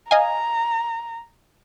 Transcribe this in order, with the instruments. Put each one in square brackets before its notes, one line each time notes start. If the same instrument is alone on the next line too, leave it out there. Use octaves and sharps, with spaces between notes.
[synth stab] D#5 F5 G#5 [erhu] A#5